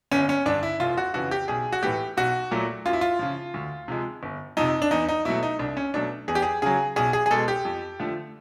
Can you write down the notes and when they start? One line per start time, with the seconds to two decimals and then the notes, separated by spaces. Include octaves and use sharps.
0.11 G1 C#4
0.29 C#4
0.46 G2 D3 D4
0.63 E4
0.80 F1 F4
0.97 F#4
1.14 F2 C#3 E3 F#4
1.31 G4
1.48 B1 G#4
1.72 F#4
1.83 A2 E3 A3 G4
2.17 B1 F#4
2.51 A#2 F#3 A3
2.86 F#2 F4
2.93 E4
3.01 F4
3.19 C#3 F3
3.54 D2
3.88 C3 F3 G#3
4.23 G1
4.57 F2 C3 D#4
4.82 D4
4.91 E2 D#4
5.08 D#4
5.25 B2 F#3 A3 E4
5.43 D#4
5.59 C2 D4
5.77 C#4
5.94 B2 F#3 A3 D4
6.28 E2 G#4
6.35 G4
6.42 G#4
6.62 C#3 F#3 G#4
6.96 B1 G#4
7.13 G#4
7.26 G#4
7.31 B2 G#3 A4
7.48 G4
7.65 F2
7.99 D3 F3 A3